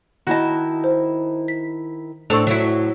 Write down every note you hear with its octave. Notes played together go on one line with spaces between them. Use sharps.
D#3 E4 F#4 D#5 A5
C5
B6
A2 C4 D4 A4 D5 C#6 E6 F7
F#3 E4